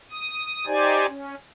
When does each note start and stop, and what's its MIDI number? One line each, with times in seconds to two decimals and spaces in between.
0.11 0.65 87
0.66 1.06 63
0.66 1.06 67
0.66 1.06 72
0.66 1.06 74
0.66 1.06 80
1.07 1.35 61